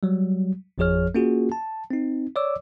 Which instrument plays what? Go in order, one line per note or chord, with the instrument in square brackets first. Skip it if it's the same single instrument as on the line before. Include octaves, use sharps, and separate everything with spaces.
[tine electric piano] F#3 G3
G#1 F2 F3 G#4 C#5 F6
A#3 C#4 F4 F#4 G#4
A5
C4 D#4
C#5 D5 D6 E6